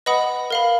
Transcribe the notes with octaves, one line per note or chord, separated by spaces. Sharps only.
B4 D#5 F#5 B5 D#6
A#4 F5 B5